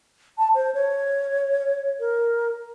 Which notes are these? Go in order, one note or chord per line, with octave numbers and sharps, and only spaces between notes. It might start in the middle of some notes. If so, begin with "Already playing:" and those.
A5
C5
C#5
A#4